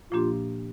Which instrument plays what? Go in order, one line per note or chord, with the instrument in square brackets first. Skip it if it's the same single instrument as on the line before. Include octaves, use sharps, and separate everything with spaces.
[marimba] A#2 F3 A#3 D4 G4 [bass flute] F4